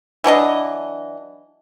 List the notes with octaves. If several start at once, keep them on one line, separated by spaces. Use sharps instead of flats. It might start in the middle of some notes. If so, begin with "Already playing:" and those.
E3 F#3 D4 D#5